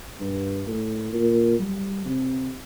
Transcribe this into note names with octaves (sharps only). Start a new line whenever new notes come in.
G2
A2
A#2
G3
C3